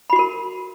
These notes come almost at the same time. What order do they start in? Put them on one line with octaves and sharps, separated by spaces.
B5 F#4 C6 A#4